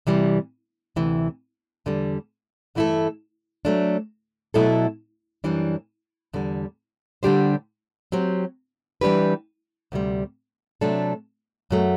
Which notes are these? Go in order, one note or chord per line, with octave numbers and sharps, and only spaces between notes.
C3 E3 G3
D2 C3 E3
E2 D3 G3
G2 E3 A3 E4 A4
F#3 A3 D4
B2 F#3 A3 E4 A4
F#2 E3 G3 D4
E2 D3 G3
D3 G3 D4 G4 C5
F#3 C4 G4
E3 G3 D4 G4 B4
D2 C3 G3
C3 F#3 A3 D4 A4
F#2 F#3 A3